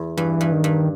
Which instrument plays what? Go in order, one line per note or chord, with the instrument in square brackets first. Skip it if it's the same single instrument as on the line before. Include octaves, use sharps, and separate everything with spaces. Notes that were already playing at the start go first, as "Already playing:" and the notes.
Already playing: [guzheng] E2
[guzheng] G2 [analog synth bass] E3
[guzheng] G2
[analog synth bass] D#3
[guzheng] G2